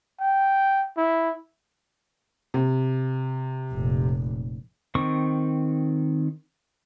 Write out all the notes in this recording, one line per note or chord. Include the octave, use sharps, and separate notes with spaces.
G5
E4
C3
F1 A#2
D#3 C4 C#6